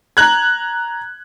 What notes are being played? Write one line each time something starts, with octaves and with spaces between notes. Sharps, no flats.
A#5 F#6 G#6